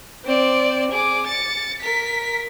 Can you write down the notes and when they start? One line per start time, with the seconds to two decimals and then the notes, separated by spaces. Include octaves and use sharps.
0.25 C4 D5
0.91 G#4 D6
1.26 A6 C#7
1.79 A#4 B6